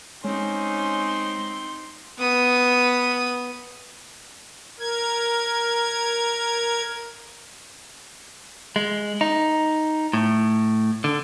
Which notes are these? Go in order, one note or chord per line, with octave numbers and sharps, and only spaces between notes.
G#3 C4 C#4 D#4 C6
B3 D#6
A#4 G#6
G#3
D#4
A2
D3